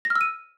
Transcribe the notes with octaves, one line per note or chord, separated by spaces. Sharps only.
A#6
F6
E6
D#7